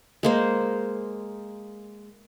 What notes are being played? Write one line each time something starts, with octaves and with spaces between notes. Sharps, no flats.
G#3 A#3 C5